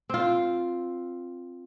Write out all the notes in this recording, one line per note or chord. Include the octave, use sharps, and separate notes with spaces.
C4 F4